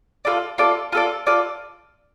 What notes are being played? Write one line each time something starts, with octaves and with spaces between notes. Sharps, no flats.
F4 A4 D5
F4 A4 D5
F4 A4 D5
F4 A4 D5